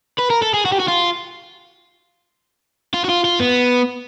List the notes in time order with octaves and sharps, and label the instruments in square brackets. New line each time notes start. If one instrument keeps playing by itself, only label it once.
[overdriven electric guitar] B4
A#4
A4
G#4
F#4
G4
F#4
F4
F4
F#4
F4
F4
B3